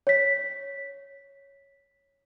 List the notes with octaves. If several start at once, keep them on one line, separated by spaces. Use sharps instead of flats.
C#5 B6